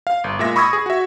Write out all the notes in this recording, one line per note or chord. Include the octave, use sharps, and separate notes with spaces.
F5
G1
A#2 G#3 E5 A#6
B5 C#6 D#6 E6 G#6 A#6
G#4
F#4 E5